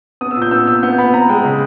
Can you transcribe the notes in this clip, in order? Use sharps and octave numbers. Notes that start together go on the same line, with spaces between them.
B3 D#6
E6
A#2 G6
B3 E6
A#2 E6
B3 G6
B3 B5
B3 A#5
G#3 G5
C#3